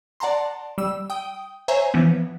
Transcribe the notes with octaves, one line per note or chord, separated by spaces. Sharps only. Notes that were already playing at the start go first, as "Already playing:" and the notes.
D5 F#5 A5 A#5 C6
G3 E6
G5 D#6
C5 C#5 E5 G#5 A#5
E3 F3 B3